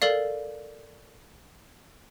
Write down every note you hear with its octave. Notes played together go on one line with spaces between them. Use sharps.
A4 A#4 D5 F5